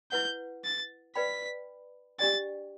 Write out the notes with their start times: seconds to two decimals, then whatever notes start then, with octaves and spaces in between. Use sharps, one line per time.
0.11 E4 B4 F#5 G6
0.64 A6
1.15 B4 D5 G5 B5 B6
2.19 D4 G4 D5 G5 A6